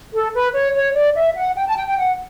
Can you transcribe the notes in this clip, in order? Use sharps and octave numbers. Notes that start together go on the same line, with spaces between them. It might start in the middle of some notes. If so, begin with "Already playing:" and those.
A4
B4
C#5
C#5
D5
E5
F#5
G5
A5
G5
G5
F#5